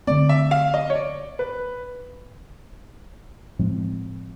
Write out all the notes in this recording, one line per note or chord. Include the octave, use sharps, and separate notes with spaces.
D3 F3 A3 C4 D5
E5
F5
D#5
C#5
D5
B4
A2 F3 G#3 C4